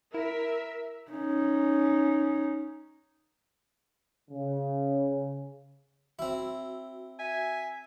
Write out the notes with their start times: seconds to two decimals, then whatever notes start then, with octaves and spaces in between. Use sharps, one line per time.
0.14 E4 A#4 E5
1.11 C#4 D#4
4.30 C#3
6.19 C4 E4 F#4
7.19 E5 G#5